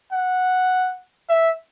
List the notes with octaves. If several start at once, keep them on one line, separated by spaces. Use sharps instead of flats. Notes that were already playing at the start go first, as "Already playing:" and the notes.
F#5
E5